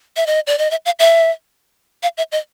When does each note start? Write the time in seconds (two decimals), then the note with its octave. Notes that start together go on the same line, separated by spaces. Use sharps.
0.16 E5
0.27 D#5
0.47 D5
0.58 D#5
0.71 E5
0.85 F5
0.99 E5
2.03 F5
2.17 E5
2.32 D#5